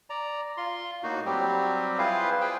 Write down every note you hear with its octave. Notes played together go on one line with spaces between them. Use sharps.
D5 A#5
F4 C6
A2 A#3 D#4 F#4
F#3 G3 C4 G4
E4 F4 G#4 B4 C5 F5
G#4 B4 C5 G5